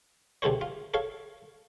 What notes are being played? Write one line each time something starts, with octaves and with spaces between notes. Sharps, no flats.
C#2 C3 E3 A4 C5 C#5
F4
A4 C#5 F5